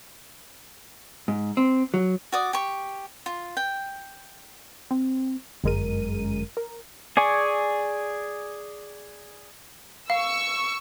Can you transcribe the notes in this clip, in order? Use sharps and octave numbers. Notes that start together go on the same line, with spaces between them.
G#2
C4
F#3
F#4 D5 D#6
G4 C#6
F4
G5
C4
G1 F#2 G#3 A#4 D#7
A#4
G#4 D5 G#5 C#6
F5 C#6 E6